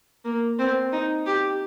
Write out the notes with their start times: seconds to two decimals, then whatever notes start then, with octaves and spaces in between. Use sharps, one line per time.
0.25 A#3
0.59 C4
0.92 D#4
1.27 G4